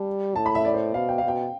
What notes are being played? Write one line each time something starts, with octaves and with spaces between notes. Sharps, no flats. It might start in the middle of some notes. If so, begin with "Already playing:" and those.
Already playing: G3 A5
A2 A5
B5
E5
D5
C5
B2 F5
G5
F5
B2 G5